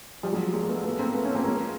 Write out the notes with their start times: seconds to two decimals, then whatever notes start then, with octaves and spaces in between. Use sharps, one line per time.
0.23 F3 G3
0.33 F#3 G#3
0.53 G#3 A#3
0.69 A3 B3
0.84 A3 B3
0.99 A#3 C4
1.14 A3 B3
1.24 B3 C#4
1.35 A#3 C4
1.45 G#3 A#3